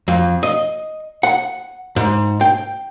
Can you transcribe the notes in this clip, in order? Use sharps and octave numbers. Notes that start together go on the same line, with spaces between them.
F2
D#5
F#5
G#2
G5